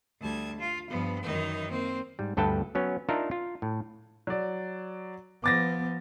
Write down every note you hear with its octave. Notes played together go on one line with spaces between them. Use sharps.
D2 G3 A5 G#6
F4
G2 F3 B3
F#2 D#3 E3 D#4
A#3 C4
G#2 G3
D2 G2 A4 B4 G5 A5
F#3 B3 C#4
D4 D#4 F4 A#4 E5
F4
A2
F#3 D5
F3 B3 D6 A6 A#6